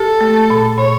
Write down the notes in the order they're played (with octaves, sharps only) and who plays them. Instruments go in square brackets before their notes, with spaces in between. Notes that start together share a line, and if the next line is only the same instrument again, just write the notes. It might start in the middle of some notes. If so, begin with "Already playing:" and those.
Already playing: [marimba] G4 [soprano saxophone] A4
[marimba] A3
A#2
[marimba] A#2 [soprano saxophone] C#5